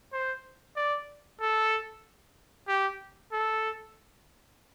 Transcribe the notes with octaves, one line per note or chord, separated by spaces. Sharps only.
C5
D5
A4
G4
A4